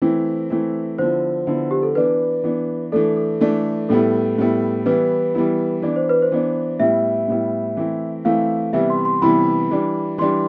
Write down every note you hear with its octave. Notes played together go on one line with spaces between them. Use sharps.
E3 A3 C4 E4 C5
E3 A3 C4 E4
D3 F3 B3 E4 C5
D3 F3 B3 E4
G4
A4
E3 B3 D4 B4
E3 B3 D4
E3 A3 D4 A4
A4
E3 A3 D4
A2 G3 B3 E4 A4
A2 G3 B3 E4
E3 G3 B3 E4 B4
E3 G3 B3 E4
E3 B3 D4 D5
C5
B4
C5
E3 B3 D4
A2 G3 B3 E4 E5
A2 G3 B3 E4
E3 A3 C4 E4
E3 A3 C4 E4 F5
C3 E3 G3 B3 E4 E5
C6
C6
C3 E3 G3 B3 E4 B5
E3 G3 D4
E3 G3 D4 C6